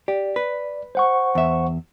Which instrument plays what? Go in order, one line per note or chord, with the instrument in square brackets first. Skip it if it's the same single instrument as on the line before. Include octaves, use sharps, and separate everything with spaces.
[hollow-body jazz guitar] G4 [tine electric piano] D5
[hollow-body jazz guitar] B4
[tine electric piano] C5 F#5 C#6
[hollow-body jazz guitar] E2 E5